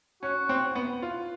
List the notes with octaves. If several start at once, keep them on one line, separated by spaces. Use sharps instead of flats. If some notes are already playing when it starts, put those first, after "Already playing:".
C#4 F#4
C4
B3
F4